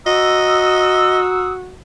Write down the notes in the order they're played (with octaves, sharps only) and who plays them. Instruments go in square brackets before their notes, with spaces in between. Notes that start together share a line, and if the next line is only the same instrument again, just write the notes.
[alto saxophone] F#4 [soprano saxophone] D#5 [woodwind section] A#5 D#6 E6